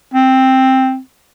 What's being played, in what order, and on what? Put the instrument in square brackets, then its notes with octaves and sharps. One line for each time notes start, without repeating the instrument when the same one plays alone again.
[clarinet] C4